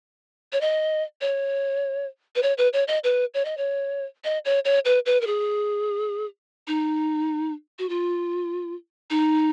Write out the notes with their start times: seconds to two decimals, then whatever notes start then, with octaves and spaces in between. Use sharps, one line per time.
0.53 C#5
0.61 D#5
1.21 C#5
2.36 B4
2.43 C#5
2.58 B4
2.73 C#5
2.88 D#5
3.04 B4
3.34 C#5
3.45 D#5
3.57 C#5
4.24 D#5
4.45 C#5
4.65 C#5
4.85 B4
5.06 B4
5.21 A#4
5.27 G#4
6.67 D#4
7.79 F#4
7.89 F4
9.10 D#4